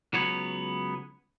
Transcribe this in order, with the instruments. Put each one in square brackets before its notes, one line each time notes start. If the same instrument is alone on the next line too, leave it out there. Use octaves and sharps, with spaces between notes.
[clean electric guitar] C#2 F#3 B3 C#5